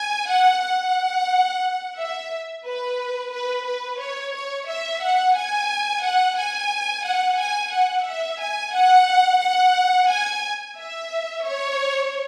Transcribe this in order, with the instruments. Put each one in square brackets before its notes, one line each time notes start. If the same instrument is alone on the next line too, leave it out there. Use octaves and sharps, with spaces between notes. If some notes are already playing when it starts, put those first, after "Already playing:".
Already playing: [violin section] G#5
F#5
F#5
E5
B4
B4
B4
C#5
C#5
E5
F#5
G#5
F#5
G#5
F#5
G#5
F#5
E5
G#5
F#5
F#5
G#5
E5
C#5